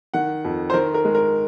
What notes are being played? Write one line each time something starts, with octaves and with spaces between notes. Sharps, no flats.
D#3 F#5
F2
C5
D#3 A#4
A#4
G#3
A#4